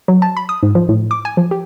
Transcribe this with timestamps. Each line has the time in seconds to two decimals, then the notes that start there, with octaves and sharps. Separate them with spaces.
0.08 F#3
0.22 A5
0.37 B5
0.49 D#6
0.63 G#2
0.75 F3
0.89 A2
1.11 D6
1.25 G#5
1.37 F3
1.51 G4